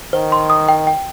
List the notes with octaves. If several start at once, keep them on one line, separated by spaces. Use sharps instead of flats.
D#3 C5
C6
D#6
G5
G5